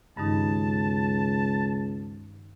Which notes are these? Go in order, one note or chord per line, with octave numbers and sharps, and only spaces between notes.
C#2 G2 D#3 D#4 A5